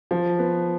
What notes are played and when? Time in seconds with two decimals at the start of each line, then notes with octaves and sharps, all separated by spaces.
0.11 F3
0.39 B3